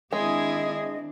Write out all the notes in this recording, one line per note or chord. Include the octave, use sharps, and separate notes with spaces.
D#3 G#3 C4 D4 E4 G#4 D#5